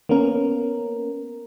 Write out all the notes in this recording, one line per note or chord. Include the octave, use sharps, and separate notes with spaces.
A#3 B3 C#4 A#4